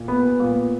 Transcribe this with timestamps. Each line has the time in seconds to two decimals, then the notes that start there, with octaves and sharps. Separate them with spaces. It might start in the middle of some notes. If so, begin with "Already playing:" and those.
Already playing: A#2
0.08 B3
0.40 A#2